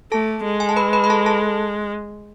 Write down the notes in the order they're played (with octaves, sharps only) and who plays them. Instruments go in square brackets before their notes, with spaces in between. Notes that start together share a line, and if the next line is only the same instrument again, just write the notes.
[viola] A3 [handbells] A4 A5
[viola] G#3
[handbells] G#5
A5
B4 B5
B4 B5
B5
A4 A5
A4 A5